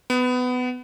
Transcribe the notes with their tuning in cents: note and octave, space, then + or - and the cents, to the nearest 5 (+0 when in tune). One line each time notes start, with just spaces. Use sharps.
B3 +20